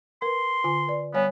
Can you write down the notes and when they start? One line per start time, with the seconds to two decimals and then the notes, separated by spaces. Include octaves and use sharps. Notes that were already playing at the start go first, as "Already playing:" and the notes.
0.22 A#4 B4 C6
0.64 D3 F4 G#5
0.88 B4 D5
1.14 G3 B3 C#5 G#5